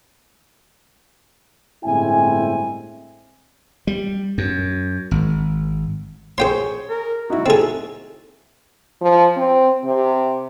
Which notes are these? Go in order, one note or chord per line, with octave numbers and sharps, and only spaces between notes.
G1 A2 G#3 C4 E4 G#5
G3
F#2
G#1
G#4 C5 C#5 G5 C6
A#4
D#4 E4 F#4
C4 G#4 A4
F3
C4
C3